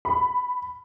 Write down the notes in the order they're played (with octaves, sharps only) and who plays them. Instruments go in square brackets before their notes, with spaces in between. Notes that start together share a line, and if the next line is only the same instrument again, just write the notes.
[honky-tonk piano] B5